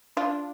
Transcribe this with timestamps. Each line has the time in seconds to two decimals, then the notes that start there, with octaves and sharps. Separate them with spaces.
0.17 D4 F4